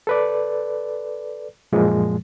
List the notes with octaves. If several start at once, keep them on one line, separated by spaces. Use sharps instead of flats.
A4 B4 D5
F#2 A#2 F3 G#3